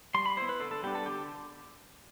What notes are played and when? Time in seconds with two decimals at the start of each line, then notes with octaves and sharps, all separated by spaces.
0.14 G3 C6
0.26 B5
0.37 B3 E4 C5
0.49 B4
0.60 D3 A4
0.71 A4
0.83 G3 B3 D4 G4
0.95 A4
1.06 D3 G4